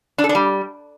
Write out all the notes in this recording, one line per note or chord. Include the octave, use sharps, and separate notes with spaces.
D4
A4
D4
G3